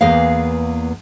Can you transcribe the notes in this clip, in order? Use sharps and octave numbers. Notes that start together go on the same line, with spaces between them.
E2 A#3 B3 G#4 F5